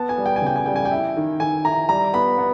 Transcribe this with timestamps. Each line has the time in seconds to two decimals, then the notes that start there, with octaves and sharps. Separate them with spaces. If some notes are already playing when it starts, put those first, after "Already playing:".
Already playing: B3 A5
0.09 G#5
0.18 G3
0.26 G5
0.36 G#5
0.42 C#3 G5
0.56 G#5
0.66 G3 G5
0.76 G#5
0.85 G5
0.91 E4
1.16 D#3
1.40 D#3 G#5
1.65 E4 A#5
1.89 G3 A#5
2.13 B3 B5
2.38 B3